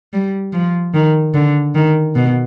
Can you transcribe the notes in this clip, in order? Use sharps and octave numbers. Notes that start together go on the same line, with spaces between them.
G3
F3
D#3
D3
D#3
B2